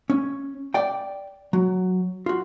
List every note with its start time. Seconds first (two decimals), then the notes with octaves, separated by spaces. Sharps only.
0.10 C#4
0.74 D5 G5
1.53 F#3
2.26 F4 F#4